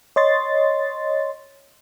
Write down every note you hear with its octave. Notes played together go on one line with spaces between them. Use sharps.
C#5 D#5 C6 A6